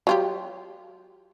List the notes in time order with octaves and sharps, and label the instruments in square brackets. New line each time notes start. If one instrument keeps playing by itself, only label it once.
[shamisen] F#3 F4 G4